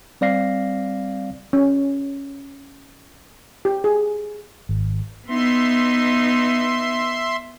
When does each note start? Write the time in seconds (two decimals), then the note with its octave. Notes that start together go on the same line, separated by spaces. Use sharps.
0.21 G3 C4 D5 F5 A#6 C7
1.53 C#4
3.65 G4
3.84 G#4
4.69 G#1
5.28 B3 D#4 E5 C6